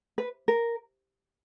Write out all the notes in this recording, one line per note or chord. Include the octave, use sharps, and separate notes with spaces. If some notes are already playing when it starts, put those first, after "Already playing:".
B4
A#4